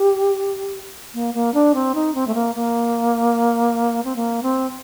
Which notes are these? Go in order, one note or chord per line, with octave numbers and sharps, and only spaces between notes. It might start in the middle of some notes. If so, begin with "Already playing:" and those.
Already playing: G4
A#3
A#3
D4
C4
D#4
C4
A3
A#3
A#3
C4
A#3
C4